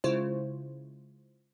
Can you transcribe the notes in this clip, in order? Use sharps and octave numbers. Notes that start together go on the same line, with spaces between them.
C#3 G#3 E4 F4 C5